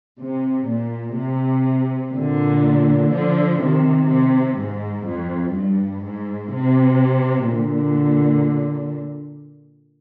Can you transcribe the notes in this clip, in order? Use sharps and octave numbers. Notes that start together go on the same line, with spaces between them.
C3
A#2
C3
A#2 D3
D3 F3
C3 D#3
C3
G#2
F2
G2
G#2
C3
A#2 D3